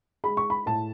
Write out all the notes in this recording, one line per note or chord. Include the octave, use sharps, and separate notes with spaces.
G#3 B5
C#6
B5
A2 A5